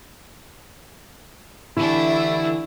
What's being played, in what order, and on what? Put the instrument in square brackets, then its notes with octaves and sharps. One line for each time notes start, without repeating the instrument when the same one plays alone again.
[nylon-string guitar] D3 E3 G4 [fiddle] A3 D4 [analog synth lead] E4